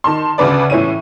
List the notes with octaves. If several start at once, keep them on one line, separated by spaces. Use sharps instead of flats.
D#3 A5 C6
D2 C#3 D4 B4 D5
A2 E3 C#4 E4 D#7